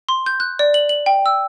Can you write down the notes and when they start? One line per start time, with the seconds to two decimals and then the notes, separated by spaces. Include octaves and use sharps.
0.09 C6
0.26 G6
0.40 F#6
0.59 D5
0.74 F#7
0.89 F#7
1.06 G5
1.26 E6